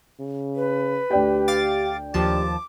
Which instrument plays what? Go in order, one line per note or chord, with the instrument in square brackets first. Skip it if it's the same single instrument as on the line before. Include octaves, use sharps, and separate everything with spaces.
[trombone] C#3
[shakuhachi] B4
[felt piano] D2 D5 G5 [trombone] G4
[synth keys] F5 D6 A6
[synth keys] D#2 F3 A5 [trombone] G4 [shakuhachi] D6